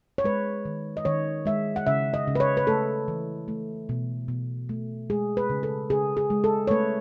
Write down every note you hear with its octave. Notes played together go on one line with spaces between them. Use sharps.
C#5
G#3 B4
D#3
D#5
D#3 C#5
G#3 E5
F#5
C#3 E5
D#5
C#3
B4
C#5
B4
A3 A4
E3
A3
B2
B2
A3
G#3 G#4
B4
C#3
A4
C#3 G#4
G#4
G#3
A4
C#5
A3 B4